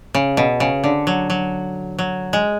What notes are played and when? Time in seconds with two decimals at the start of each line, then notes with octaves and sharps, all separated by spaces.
0.15 C#3
0.37 B2
0.60 C#3
0.84 D3
1.07 F#3
1.30 F#3
1.99 F#3
2.33 G#3